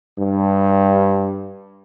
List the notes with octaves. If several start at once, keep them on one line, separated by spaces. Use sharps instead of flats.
G2